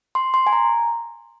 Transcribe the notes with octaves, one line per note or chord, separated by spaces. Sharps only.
C6
C6
G#5
A#5